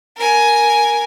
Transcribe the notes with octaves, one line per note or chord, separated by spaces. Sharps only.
A#4 G#5